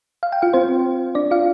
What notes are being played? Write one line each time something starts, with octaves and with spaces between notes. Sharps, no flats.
F5
G5
F4 F5
C4 C5
D4 D5
F4 F5